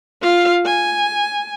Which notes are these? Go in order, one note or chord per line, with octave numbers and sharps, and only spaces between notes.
F4 F5
G#5